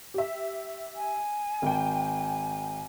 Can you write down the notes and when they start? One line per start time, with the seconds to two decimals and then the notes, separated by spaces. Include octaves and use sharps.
0.14 G4 E5
0.96 G#5
1.62 G#1 G5